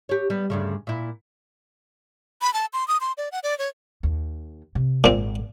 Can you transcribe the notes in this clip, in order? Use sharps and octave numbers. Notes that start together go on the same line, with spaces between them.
G4 C#5
G3 B3
D2 G2 C#3
A#2 E4
B5
A5
C6
D#6
C6
D5
F#5
D5
C#5
D#2
C3
G#1 A#2 G#3 C4